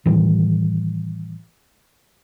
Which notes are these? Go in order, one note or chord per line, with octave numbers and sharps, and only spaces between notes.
A2 D#3 E3 G3